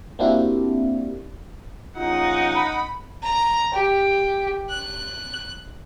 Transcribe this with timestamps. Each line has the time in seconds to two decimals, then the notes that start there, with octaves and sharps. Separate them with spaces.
0.19 A#3 C4 D4 E4 F#4 G4
1.97 A#1 C#4 D#4 F4 F#5
2.55 B5
3.23 A#5
3.73 G4
4.70 F#6